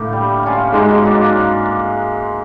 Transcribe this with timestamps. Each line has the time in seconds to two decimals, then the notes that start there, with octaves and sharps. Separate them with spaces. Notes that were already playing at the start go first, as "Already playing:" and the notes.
Already playing: A2 D3 A3 A#3
0.13 G3
0.43 A#3 C#4 F4
0.73 G#2 B2 G#3
1.03 F#3 A#3 D4